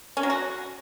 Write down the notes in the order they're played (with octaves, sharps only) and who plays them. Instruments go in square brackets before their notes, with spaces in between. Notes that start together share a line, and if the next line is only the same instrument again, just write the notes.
[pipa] C#4
F#3
F#4